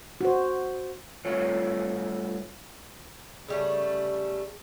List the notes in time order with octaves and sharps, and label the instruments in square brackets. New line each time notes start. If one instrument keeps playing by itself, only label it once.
[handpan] F#4 C5
[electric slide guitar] G2 A3 F4 C#5
[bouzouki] C#3 G3 A3